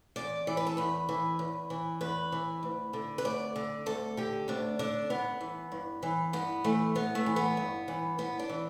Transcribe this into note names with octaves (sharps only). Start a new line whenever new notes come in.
E2 D5
E3 D5
B4
A4
E2 B4
E3
E2
E3
E2 B4
E3
D2
D3
B4
D2 D5
D3
D2 A4
D3 G4
D2 D4
D3 D4
G2 B3
E3
G2
E3
G2 B3
E3 A3
G2 B3
A3
E3
B3
G2
E3
G2 B3
D4
E3